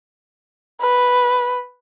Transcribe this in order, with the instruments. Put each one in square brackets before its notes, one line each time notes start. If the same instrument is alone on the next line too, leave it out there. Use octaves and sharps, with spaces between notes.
[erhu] B4